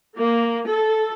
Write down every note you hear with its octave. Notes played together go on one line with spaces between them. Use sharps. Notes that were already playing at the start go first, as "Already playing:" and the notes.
A#3
A4